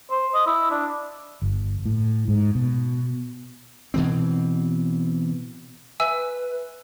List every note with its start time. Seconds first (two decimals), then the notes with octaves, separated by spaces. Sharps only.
0.11 C5
0.34 D#5
0.46 E4
0.71 D4
1.42 G1
1.86 A2
2.28 G#2
2.55 B2
3.94 B2 E3 C4
6.00 B4 E5 G#5 E6